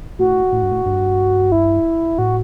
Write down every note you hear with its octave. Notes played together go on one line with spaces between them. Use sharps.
A2 F#4
A2
G2
A2
G2
E4
A2 F#4